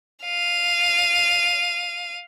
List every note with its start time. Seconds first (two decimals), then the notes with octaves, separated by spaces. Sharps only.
0.24 F5 D#7